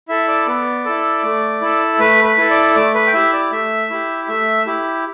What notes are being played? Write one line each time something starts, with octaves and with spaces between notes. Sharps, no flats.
E4 A4 E5
D5
B3
E4 A4
A3
E4 A4
A3 B4
B4
E4 A4
D5
A3 D5
B4
G5
E4 G4 E5
D5
A3 E5
E4 G4
A3 E5
E4 G4